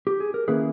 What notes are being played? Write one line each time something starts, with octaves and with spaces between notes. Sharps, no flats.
G4
G#4
A#4
D#3 A#3 C#4 E4 G#4 B4